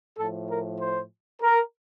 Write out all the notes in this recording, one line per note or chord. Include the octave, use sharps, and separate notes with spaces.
A2 F3 A4
A#4
C5
A#4